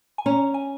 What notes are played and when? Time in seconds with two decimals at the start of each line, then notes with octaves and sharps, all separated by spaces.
0.18 G#5
0.26 C#4 A#5
0.54 G#5